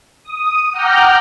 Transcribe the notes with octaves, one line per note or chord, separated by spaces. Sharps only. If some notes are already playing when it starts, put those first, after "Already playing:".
D#6
F#5 G5 A#5 D6 F6 G6